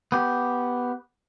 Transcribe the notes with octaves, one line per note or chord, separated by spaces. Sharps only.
B3 G4